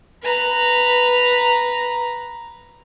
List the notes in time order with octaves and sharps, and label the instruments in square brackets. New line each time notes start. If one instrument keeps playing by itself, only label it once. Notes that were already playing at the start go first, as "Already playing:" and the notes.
[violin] B4 A#5